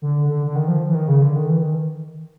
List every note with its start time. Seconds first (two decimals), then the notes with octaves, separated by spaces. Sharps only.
0.02 D3
0.29 D3
0.47 D3
0.55 D#3
0.68 F3
0.88 E3
0.95 D#3
1.08 C#3
1.22 D3
1.36 D#3
1.49 E3
1.61 D#3